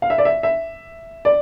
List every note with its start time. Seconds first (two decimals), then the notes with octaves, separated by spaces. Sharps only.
0.02 F5
0.10 E5
0.18 D5
0.25 E5
0.43 E5
1.25 D5